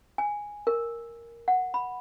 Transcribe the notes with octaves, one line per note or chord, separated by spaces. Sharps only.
G#5
A#4
F#5
B5